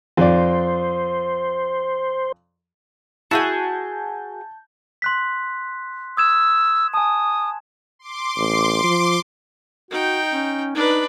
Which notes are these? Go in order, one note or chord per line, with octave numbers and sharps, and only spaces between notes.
F2 C5 D5
E4 F#4 G#4 G#5 A5 G6
C6 F#6 B6
D#6 E6 G#6 E7
G#5 A5 D#6
C6 D6
A1
F3
D#4 F#4 G5
C#4
D4 D#4 B4